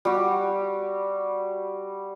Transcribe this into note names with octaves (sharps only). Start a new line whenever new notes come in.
G3 F#4 G4